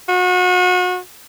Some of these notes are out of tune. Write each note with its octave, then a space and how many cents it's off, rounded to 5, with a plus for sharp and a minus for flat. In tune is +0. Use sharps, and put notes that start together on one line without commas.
F#4 -35